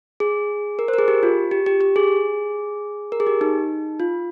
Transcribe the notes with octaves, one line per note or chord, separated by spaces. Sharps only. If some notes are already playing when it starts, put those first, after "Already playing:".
G#4
A#4
C5
A#4
G#4
G4
F4
G4
G4
G4
G#4
A#4
G#4
G4
D#4
F4